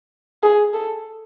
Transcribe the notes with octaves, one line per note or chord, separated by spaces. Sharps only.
G#4
A4